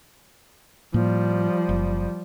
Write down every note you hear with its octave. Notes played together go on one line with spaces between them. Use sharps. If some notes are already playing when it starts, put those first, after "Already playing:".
A2 F3 G3 A#3
F#1